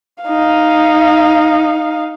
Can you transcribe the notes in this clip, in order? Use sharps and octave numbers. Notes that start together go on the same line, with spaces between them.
D#4 F5